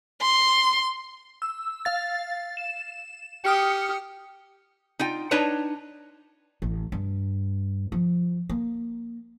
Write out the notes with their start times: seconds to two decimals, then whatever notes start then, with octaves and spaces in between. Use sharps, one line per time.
0.22 C6
1.42 E6
1.85 F5 A6
2.57 E7
3.45 G4 D#6 F6 C#7
4.99 D#4 F4 G5
5.31 D4 D#4 B4 C#5 A5 A#5
6.62 A1
6.92 G2
7.92 F3
8.50 A#3